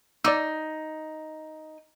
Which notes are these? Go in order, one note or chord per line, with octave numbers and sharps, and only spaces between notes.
D#4 D5 D6 E6